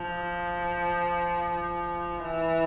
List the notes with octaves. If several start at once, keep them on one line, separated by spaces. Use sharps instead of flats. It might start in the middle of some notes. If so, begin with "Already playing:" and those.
Already playing: F3
E3